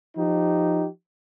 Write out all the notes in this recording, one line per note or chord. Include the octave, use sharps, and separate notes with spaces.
F3 D#4 G4